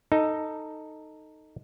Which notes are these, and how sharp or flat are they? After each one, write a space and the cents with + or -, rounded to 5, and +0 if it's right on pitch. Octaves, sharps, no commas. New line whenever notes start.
D#4 +0 A4 +10